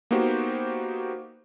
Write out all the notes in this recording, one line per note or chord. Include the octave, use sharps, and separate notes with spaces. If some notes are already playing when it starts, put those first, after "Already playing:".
A#3 B3 D#4 F#4 G4 C5